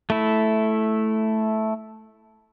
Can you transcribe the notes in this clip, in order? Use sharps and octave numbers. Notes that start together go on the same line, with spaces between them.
A3 E4